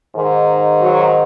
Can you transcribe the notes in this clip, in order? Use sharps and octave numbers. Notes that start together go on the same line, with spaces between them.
G#2 D#3
F#3